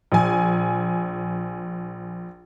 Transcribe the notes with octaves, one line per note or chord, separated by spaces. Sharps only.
A#1 G#5